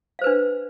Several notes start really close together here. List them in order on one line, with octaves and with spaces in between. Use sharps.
F5 C5 B4 D4